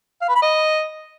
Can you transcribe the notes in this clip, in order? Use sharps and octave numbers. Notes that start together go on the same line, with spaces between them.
F5
B4
B5
D#5